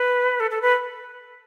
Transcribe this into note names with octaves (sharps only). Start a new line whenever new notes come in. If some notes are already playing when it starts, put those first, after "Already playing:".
Already playing: B4
A4
A4
B4